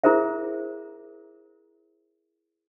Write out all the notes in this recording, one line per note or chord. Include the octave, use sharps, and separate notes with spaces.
E4 G#4 A#4 C5 E5